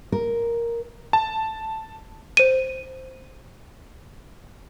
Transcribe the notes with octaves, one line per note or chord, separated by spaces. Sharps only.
A#4
A5
C5 D#7